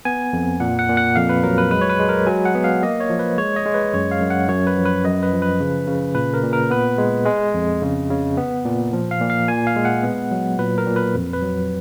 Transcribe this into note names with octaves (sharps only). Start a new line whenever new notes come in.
B3 G#5
F2
A#2 F#5
F#5
A#2
F#5
F2 F5
B4
F#3 A#4
B4
G#3 B4
C#5
B4
G#3
A#4
F#3 G#5
F#5
B3
F5
A#3 D#5
C#5
F3
B4
G#3 C#5
D#5
G#3
B4
F#2 C#5
F5
F#2
F#5
F#2 C#5
B4
F3
B4
F#2 D#5
B4
F3
B4
C#3
C#3
A#2 B4
A#4
A#2
A#4
B3 B4
G#3
G#3 D#5
F2
C#3
C#3
B3
A#2
F3
F5
A#2
F5
A#2 G#5
F5
G#3
F#5
B3
F#3
A#2 B4
A#4
A#2
B4
F2
B4
F#3